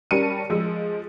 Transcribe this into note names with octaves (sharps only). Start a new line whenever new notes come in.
G3 C#4 A#4 A5 C#7 D#7
F3 G#3 E6